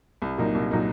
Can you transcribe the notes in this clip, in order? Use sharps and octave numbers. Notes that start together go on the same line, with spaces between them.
C2
A#2 F#3 A#3 D#4
C2
A#2 F#3 A#3 D#4